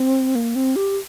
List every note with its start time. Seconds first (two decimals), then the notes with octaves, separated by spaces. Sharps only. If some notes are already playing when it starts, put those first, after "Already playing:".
Already playing: C4
0.35 A#3
0.55 C4
0.76 G4